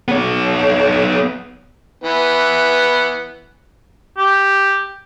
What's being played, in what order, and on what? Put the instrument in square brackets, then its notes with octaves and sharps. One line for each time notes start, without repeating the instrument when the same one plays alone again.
[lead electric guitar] B3 C#5
[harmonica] E3 B3
[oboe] G4